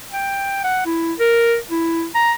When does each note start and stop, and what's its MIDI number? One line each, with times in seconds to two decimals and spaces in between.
0.13 0.61 79
0.64 0.82 78
0.86 1.13 64
1.19 1.57 70
1.70 2.06 64
2.15 2.33 82